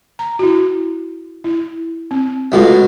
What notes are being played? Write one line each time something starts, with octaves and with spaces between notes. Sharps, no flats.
A#5
E4 F#4
E4
C4
C#2 B2 A3 F4 A4